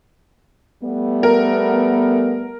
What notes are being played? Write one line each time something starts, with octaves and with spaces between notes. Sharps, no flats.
G3 A3 B3
A#4